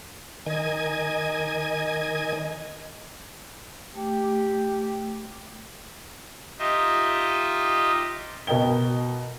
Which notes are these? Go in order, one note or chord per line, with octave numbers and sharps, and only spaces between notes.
D#3 D#5 G#5 G#6
A3 G4 G5 D6
D#4 F4 G4 D#5 E5
B2 A#4 D#5 G5 G7